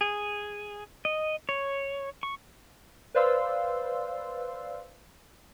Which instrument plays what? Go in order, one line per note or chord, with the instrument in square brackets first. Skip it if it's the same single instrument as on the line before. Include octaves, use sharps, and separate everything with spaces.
[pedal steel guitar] G#4
D#5
C#5
C#6
[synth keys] B4 C5 D5 F5 C6 E6